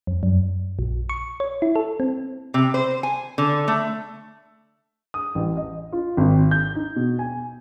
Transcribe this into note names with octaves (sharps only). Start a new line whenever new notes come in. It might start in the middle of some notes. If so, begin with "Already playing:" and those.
F2
F#2
A#1
C#6
C#5
E4
A4
C4
C3
C5
G#5
D3
A3
D#6
A1
D#5
F4
G#1
G6
D#4
B2
G#5